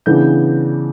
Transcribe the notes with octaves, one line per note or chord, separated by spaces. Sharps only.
C#3 E3 B3 D4 G6